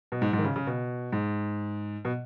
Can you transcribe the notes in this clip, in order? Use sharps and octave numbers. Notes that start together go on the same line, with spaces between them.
B2
G#2
G#2
D#3
C#3
C#3
B2
G#2
B2